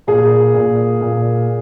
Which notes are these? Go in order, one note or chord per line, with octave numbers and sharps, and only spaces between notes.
A#2 G#4
A#2
A#2